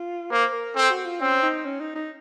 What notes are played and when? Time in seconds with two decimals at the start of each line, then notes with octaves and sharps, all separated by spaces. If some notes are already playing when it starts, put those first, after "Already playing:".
Already playing: F4
0.31 A#3 C5
0.53 A#4
0.75 C4 A4
0.90 F#4
1.05 F4
1.20 C4 C#4
1.43 D#4
1.65 C#4
1.80 D#4
1.95 D#4